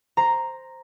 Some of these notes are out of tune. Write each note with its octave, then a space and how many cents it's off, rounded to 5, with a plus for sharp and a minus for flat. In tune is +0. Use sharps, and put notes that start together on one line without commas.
C5 +0 A#5 +0